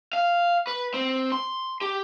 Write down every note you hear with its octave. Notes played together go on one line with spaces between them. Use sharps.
F5
B4
C4
C6
G4